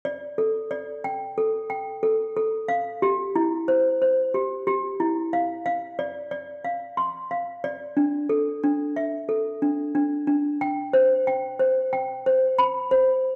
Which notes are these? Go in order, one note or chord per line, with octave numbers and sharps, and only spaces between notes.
D5
A4
D5
G5
A4
G5
A4
A4
F5
G4
E4
C5
C5
G4
G4
E4
F5
F5
D5
D5
F5
C6
F5
D5
D4
A4
D4
E5
A4
D4
D4
D4
G5
C5
G5
C5
G5
C5
B5
C5